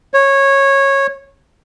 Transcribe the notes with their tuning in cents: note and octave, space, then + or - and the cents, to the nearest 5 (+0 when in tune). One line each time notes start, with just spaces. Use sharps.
C#5 -15